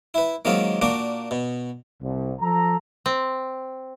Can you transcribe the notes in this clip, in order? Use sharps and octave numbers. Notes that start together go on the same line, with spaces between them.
E4 B4
D#3 F#3 G#3 A#3 C4 F4
A#2 A#3 D4 F#4 D6
B2
C2
F3 A4 A#5
C4